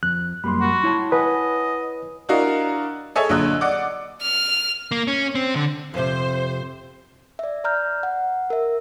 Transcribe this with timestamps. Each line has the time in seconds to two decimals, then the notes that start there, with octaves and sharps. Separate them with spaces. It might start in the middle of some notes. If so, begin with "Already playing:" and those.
0.03 F2 F#6
0.44 F#2 G3 A#3 B5 C6
0.61 F#4
0.84 E4 C#5 A5
1.12 B4 D#5 F#5 G#5
2.29 D4 E4 F#4 A#4 D#5 F5
3.15 G#4 A4 C#5 D#5 E5 G#5
3.29 A#1 D3 F#3 D#5 E6 F#6
3.61 D5 D#5 F#5 D6
4.22 F6
4.91 A#3
5.07 C#4
5.35 C4
5.55 D3
5.94 F2 C3 C5
7.39 D5 E5
7.64 D5 A#5 F6 G6
8.03 F#5
8.50 A#4 E5